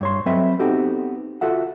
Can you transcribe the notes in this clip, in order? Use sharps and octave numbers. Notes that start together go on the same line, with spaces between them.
G2 C#5 C6
F#3 C4 A4 B4 D#5 E5
B3 C4 D#4 F#4 G4 A4
F4 F#4 A4 E5 F#5